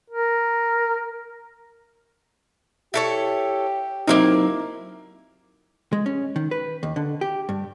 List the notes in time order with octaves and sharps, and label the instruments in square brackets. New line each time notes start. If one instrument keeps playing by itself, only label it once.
[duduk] A#4
[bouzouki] E4 A4 C#5 [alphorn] G4
[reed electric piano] F#3 C4 D#4 [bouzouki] A#3 E4 F5
[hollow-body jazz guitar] G#3
C#4
D#3
B4
D#2
D3
G4
G2